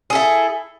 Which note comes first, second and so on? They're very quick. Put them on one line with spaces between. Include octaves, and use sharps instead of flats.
G#4 A4 E4